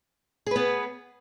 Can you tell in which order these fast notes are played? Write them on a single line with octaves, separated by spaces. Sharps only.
G#4 B4 B3